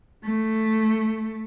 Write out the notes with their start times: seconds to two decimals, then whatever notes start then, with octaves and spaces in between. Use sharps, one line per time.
0.24 A3